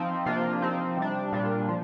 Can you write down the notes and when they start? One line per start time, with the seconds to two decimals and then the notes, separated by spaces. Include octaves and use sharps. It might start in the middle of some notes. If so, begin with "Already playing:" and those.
Already playing: F3 C4 D#4
0.25 C3 F3 A#3 D4 F4
0.62 F3 C4 D#4
0.97 C3 G3 D4
1.32 A#2 G3 D4 F4
1.69 F3